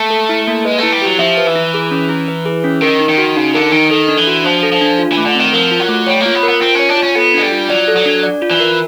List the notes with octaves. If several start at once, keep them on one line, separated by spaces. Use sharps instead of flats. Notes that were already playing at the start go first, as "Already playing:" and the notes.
Already playing: A3
A4
E4
A#3
G#3 B4
A3 E4
G3
F#3 G4
F3 E5
B4
E3
E4
G#4
C#4
E4
B4
G#4
C#4
D#3 A#4
D#4
D#3
F#4
C#3 D#4
D3 A#4
D#3 D#4
D#3 A4
D4
E3
F#4
F3 D4
A4
F3
D4
F4
E3
A3
D3
D#3 C4
F3 A#4
F4
F#3
A3
G3 C#5
A#3
F4
B3
A#4
B3
C4 F4
C#4 C#5
D4
F4
C#4
B3 A4
G#3 D4
G3
F4
F#3 D5
A4
F#3
D4
D5
F4
E3
A#4